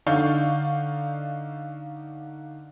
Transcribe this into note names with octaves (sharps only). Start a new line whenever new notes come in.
D3 D#4 D5 F5 C#6 G6